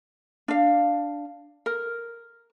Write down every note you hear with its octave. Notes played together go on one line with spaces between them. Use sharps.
D4 F5
A#4